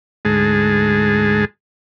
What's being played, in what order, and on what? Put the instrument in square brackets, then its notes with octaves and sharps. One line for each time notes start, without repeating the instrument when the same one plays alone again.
[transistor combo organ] D2 G#2 G#3 G#4 A5